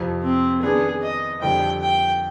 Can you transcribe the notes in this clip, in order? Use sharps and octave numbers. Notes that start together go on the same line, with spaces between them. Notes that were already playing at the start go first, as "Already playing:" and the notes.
Already playing: F2 C3 F3
C4
D#3 B3 D4 G#4
D#5
F2 D3 G3 G5
G5